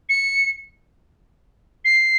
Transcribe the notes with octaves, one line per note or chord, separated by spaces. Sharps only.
C#7
C7